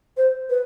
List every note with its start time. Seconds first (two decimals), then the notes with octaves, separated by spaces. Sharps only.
0.17 C5
0.50 B4